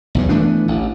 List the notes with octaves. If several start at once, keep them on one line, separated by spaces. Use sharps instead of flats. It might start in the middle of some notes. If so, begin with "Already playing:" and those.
B1 E2 G2
E3 A3 B3 D4
A1